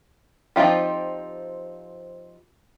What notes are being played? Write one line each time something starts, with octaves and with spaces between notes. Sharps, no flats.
F3 C4 D#4 F4 G4